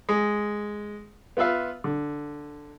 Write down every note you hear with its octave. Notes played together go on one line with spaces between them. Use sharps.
G#3
B3 F4 B4 E5 F5
D3